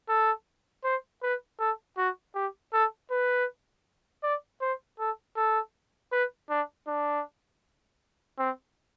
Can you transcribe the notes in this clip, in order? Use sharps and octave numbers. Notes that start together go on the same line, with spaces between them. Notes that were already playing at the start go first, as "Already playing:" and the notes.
A4
C5
B4
A4
F#4
G4
A4
B4
D5
C5
A4
A4
B4
D4
D4
C4